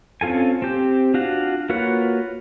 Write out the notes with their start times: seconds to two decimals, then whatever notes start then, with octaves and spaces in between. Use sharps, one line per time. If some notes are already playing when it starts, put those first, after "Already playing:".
0.21 C4 C#4 F4 A4 G#5
0.62 C4 G4
1.14 D4 F4 F#4 F5
1.69 A#3 F4 F#4 B4 C#5